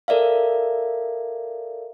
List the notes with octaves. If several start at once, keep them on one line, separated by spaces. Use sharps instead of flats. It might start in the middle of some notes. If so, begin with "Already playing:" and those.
A4 A#4 D5 E5 F5